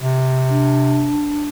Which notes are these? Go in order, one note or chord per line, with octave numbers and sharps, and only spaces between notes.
C3
D4